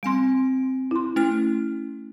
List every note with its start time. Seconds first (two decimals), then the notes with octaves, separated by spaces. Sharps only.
0.03 G3 C4 G#5 C6 D7
0.91 E4 C6
1.16 A3 C#4 E4 F6